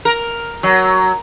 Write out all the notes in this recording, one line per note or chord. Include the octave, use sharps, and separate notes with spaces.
A#4
F#3